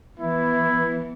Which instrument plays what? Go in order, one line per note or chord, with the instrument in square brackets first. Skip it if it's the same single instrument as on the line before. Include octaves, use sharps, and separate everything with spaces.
[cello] E3 B3 [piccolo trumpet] E4